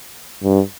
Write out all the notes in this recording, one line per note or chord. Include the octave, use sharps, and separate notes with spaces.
G2